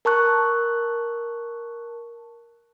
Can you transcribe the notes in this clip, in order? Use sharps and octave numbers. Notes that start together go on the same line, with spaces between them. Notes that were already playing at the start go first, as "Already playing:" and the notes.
A#4 A5 C#6 F#6